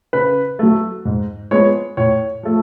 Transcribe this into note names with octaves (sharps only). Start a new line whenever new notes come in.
C#3 B4
F#3 A3
G#2
F3 G#3 B3 C#5
A2 C#5
F3 A3